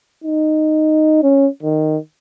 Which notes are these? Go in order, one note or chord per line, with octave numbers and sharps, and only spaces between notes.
D#4
C#4
D#3